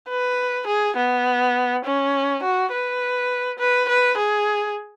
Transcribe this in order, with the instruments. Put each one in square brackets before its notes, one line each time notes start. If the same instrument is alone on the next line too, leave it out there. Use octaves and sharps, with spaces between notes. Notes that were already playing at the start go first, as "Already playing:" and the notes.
[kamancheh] B4
G#4
B3
C#4
F#4
B4
B4
B4
G#4